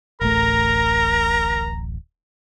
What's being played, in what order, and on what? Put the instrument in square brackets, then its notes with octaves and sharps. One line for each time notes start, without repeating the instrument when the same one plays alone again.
[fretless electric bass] D1 A1 A3 [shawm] A#4 [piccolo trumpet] A#5